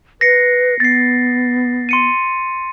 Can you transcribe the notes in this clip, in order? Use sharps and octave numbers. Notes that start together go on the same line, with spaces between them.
B4 A#6 C7 C#7
B3 A6 C7
C6 C#7 D#7